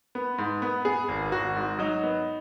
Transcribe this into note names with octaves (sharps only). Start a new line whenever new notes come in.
B3
G#2
B3
B3 G#4
G#1
G#1 F#4
G#2
F#3 D#4
B3